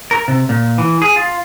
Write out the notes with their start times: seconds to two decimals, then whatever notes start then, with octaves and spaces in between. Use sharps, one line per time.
0.11 A#4
0.28 C3
0.49 A#2
0.78 E3
1.02 G#4
1.16 F4